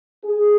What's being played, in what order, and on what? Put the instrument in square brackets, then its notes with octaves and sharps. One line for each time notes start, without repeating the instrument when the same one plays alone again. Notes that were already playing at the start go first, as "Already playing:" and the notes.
[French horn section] G#4